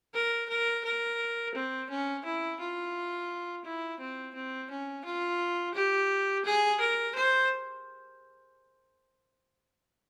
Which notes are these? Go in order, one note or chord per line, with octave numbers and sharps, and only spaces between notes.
A#4
A#4
A#4
C4
C#4
E4
F4
E4
C4
C4
C#4
F4
G4
G#4
A#4
C5